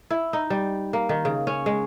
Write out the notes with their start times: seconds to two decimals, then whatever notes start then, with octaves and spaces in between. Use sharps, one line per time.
0.11 E4
0.33 D#4
0.50 G3
0.93 A#3
1.09 D#3
1.25 C#3
1.47 C#4
1.66 G#3